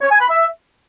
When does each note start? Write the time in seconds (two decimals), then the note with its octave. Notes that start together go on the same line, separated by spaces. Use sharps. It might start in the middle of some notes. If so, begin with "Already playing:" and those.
0.01 C#5
0.11 G#5
0.20 B5
0.30 E5